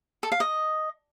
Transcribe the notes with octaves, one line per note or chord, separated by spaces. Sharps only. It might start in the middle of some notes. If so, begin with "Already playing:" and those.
A4
F5
D#5